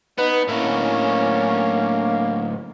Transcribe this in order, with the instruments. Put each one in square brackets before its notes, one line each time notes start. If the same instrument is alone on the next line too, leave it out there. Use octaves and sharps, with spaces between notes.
[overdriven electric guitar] B3 [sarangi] D#4 [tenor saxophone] B4
[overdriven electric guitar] D2 A2 [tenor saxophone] A#3 [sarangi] C#4